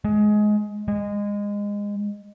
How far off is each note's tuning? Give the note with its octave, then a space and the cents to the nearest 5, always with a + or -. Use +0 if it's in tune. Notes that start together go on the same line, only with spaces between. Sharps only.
G#3 +20
G#3 -20